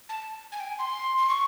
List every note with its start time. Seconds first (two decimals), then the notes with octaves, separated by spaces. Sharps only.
0.09 A5
0.52 G#5
0.60 G5
0.68 G#5
0.79 C6
1.18 C6
1.29 C#6